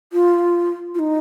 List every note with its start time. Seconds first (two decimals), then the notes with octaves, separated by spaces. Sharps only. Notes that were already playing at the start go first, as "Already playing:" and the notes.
0.13 F4
0.95 F4
0.99 D#4